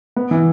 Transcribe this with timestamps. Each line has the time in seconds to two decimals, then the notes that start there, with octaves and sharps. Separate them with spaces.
0.16 B3
0.31 E3